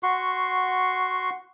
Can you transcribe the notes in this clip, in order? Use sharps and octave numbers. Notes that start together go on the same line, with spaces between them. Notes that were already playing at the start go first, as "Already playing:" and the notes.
F#4 C6 C#6